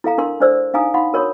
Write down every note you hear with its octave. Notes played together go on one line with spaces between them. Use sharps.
E4 A4 F5 A#5
D4 A#4 C6
D4 A4 C5 D5 E6
D4 D#4 F5 G#5 A#5 D#6
D#4 F5 F#5 B5 C6
F#4 A#4 C#5 B5 C6 D#6